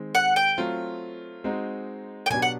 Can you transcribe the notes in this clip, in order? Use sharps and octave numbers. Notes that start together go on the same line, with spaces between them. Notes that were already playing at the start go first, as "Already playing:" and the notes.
Already playing: D#3 G#3 C4
F#5
G5
F#3 A3 C4 F4
G#3 C4 D#4 F#4
G5
B2 F#3 B3 D4 G4 G#5
F#5